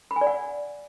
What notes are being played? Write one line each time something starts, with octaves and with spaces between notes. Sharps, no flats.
B5
G#5
D5
F#5